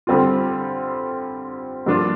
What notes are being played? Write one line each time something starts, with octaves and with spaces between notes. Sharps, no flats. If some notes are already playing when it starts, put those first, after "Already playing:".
D3 G3 C4 F4
G2 F3 A#3 D4 F4